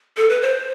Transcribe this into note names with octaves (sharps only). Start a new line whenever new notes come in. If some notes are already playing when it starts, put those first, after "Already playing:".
A4
B4
C5